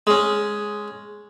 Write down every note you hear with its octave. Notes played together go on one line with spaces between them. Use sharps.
G#3 C#4